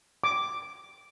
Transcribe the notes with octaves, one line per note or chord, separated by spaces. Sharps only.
D6